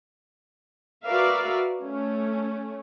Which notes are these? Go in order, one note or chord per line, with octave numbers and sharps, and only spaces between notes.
F#4 A#4 B4 D5 E5 F5
A3 C#4